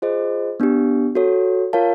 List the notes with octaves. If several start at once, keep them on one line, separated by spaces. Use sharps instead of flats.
F4 G#4 C5 D#5
B3 D4 G4
F#4 A4 C#5
F4 A#4 C#5 F5 A5